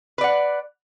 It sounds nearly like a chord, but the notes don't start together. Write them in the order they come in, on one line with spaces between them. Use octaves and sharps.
B4 D5 F#5